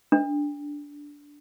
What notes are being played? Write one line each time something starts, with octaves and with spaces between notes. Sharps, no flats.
D4